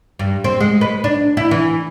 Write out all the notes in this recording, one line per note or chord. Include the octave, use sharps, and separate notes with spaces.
G2
C4
G#3
B4
D4
E4
E3